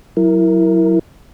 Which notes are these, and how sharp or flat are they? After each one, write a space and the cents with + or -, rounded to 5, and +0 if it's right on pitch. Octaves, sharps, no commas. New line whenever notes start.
F#3 +0 E4 +0 A#4 +0